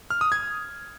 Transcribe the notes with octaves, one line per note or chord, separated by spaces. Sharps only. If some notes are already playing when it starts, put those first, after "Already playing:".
F6
D#6
G#6